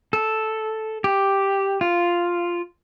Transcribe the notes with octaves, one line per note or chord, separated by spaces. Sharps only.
A4
G4
F4